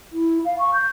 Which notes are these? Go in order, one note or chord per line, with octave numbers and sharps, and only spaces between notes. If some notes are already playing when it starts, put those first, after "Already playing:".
E4
F5
C#6
G6